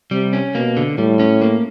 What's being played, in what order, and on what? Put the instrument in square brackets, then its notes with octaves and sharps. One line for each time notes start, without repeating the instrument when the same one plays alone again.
[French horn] C3 [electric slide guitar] G3
[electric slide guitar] C#4
[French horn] B2 [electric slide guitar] A#3
[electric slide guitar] D3
[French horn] A2 [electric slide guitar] G3
[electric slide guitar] C#4
A#3